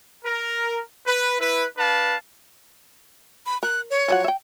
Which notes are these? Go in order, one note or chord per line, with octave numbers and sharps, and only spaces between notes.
A#4
B4
E4 B4
D4 B4 F5 A5
B5
A#4 F#6
C#5
F3 F#3 F#5
E5 G5